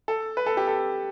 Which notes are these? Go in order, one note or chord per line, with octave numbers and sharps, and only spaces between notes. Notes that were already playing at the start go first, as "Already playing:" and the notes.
A4
B4
A4
G4
A4